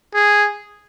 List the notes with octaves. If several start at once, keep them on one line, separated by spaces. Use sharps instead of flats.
G#4